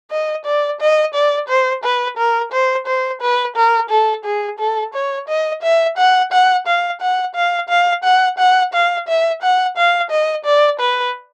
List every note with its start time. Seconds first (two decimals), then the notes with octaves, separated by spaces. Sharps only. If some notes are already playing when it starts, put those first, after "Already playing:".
0.11 D#5
0.45 D5
0.80 D#5
1.14 D5
1.48 C5
1.84 B4
2.17 A#4
2.52 C5
2.87 C5
3.21 B4
3.56 A#4
3.90 A4
4.24 G#4
4.59 A4
4.94 C#5
5.28 D#5
5.63 E5
5.97 F#5
6.32 F#5
6.66 F5
7.01 F#5
7.35 F5
7.69 F5
8.04 F#5
8.38 F#5
8.73 F5
9.08 E5
9.42 F#5
9.77 F5
10.10 D#5
10.45 D5
10.79 B4